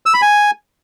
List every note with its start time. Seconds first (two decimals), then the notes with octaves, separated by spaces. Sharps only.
0.06 E6
0.14 B5
0.22 G#5